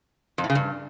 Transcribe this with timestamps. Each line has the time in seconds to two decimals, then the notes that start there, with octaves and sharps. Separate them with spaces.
0.38 F2
0.44 A2
0.50 C#3
0.55 G2